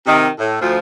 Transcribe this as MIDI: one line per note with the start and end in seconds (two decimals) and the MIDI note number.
0.06 0.28 48
0.06 0.28 51
0.38 0.58 45
0.61 0.79 38
0.61 0.79 53